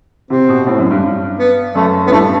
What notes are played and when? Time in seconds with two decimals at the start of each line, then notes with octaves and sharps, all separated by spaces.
0.30 C3 C4
0.49 B2
0.67 A2
0.79 F#2
0.91 G2
1.03 G2
1.39 B3
1.75 F#2 A3
2.06 A2 B3
2.12 G2 A3